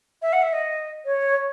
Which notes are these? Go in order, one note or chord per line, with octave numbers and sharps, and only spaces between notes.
E5
F#5
E5
D#5
C#5